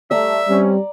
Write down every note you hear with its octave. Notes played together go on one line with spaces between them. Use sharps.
G3 A3 D5 E5 A#5
G3 C4 C#4